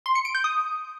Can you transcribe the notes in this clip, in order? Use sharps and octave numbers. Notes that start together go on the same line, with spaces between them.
C6
C#7
D7
G6
D#6